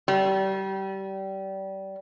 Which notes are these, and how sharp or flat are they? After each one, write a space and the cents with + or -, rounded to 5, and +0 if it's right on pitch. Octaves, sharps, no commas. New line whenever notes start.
G3 -25